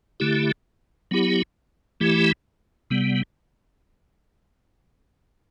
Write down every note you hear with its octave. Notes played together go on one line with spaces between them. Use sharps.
D3 A3 E4 G4
F#3 B3 E4 G4
E3 A3 E4 G4
C3 G3 B3